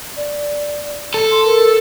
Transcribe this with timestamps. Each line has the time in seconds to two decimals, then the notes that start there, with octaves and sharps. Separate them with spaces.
0.17 D5
1.14 A4
1.32 C6
1.45 A#4